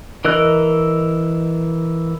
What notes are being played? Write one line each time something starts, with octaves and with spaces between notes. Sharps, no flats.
E3 A#4 D#5 E6 F#6